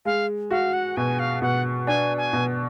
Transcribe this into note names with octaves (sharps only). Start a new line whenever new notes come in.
G#3 F5
F#4 F5
F#5
B2 G#5
F5
B2 F#5
D4 G#5
G#5
B2